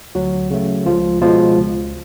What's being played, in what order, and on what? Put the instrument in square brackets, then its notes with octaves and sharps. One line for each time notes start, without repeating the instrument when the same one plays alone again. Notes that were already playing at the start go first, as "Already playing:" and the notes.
[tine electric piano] D2 F#3 F#4
C#3 F#3 A3
C#2 F3 F4
B2 F3 G#3 F4
C#2